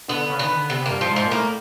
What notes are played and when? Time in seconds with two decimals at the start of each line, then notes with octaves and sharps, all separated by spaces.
0.08 D3 B3
0.30 C#3
0.39 D#3 B3
0.50 D3
0.70 C3 B3
0.86 A#3
0.91 G2
1.01 F3
1.11 G#2
1.16 F3
1.27 A#2
1.31 A2 A#3